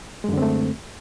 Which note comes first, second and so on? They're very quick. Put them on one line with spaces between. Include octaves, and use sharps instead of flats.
G#3 F#2 D3 C4 A3